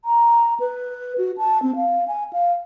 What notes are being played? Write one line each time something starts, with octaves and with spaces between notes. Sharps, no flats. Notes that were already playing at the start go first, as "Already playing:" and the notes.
A#5
B4
F#4
A5
C4
F5
G#5
F5